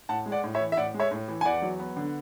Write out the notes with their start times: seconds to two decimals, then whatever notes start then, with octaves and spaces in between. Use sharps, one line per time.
0.09 A2 F#5 A5
0.26 G#3
0.32 D5 F#5
0.43 A2
0.55 C#5 E5
0.60 E3
0.72 E5
0.77 A2 D5 F#5
0.94 G#3
1.00 C#5 E5
1.11 A2
1.28 E3
1.41 G#5
1.45 E2 D5 F#5
1.62 F#3
1.80 B3
1.97 D3